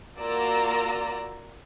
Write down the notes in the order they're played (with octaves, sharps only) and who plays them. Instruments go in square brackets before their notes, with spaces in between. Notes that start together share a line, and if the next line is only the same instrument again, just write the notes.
[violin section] A#3 F4 F#4 D5 A#5 E6